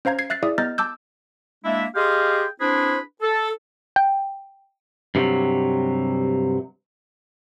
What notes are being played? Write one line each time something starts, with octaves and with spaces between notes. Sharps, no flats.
C#4 C5 F5 A#5 G#6
G#6 C7
E5 F#6 A6 C7
E4 G#4 D5 E5 D#6
B3 D#5 A#5 F6 G6 A6
A5 D6 E6 G6
G#3 A#3 D4 E4 E5
G4 G#4 D#5 F5 G5 C6
C4 D4 E4 G#4 B4 C5
A4
G5
G2 C3 E3 F#3